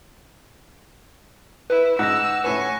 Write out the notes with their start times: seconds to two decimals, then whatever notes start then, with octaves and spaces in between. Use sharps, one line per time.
1.70 E4 B4
1.99 G#2 F#5 E6 F#6 A#6
2.44 A2 B4 G#5 C#6